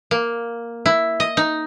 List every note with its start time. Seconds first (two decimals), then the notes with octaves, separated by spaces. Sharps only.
0.11 A#3
0.86 E4
1.20 D#5
1.37 D#4